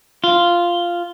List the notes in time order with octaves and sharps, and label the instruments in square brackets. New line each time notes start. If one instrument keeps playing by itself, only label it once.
[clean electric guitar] F4